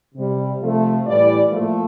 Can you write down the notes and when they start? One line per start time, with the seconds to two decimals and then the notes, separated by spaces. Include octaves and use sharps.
0.15 C3 G3
0.61 C3 F3 A3
1.06 A2 E3 G3 D5
1.51 A#2 F3 A3